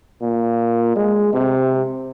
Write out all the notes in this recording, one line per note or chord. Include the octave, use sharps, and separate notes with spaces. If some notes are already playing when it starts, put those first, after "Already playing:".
A#2
G#3
C3